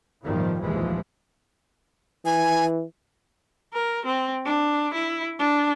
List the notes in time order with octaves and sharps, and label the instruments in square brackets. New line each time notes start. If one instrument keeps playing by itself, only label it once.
[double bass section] A1 E2 G2 D#3 F3 G3
F1 A#1 D#2 E3 F3 G#3
[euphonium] E3 [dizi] G#5
[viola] A#4
C4
D4
E4
D4